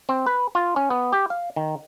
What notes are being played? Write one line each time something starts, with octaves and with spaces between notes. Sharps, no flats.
C4
B4
F4
C#4
B3
G4
F5
D#3